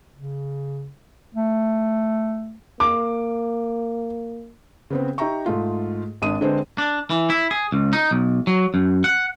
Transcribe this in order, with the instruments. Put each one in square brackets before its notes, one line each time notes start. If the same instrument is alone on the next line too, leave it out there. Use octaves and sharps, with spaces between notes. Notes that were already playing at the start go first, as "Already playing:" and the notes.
[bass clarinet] C#3
A3
[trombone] A#3 [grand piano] D6
[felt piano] C#3 B3 C4
D#4 G4 E5 G5 A#5 C#6
G#2 A3 F4
G#1 D4 D#6 D#7
D3 G#3 C4 D4 B4 C5
[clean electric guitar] D4
E3
E4
G#4
C#2
D#4
B1
F#3
F#2
F#5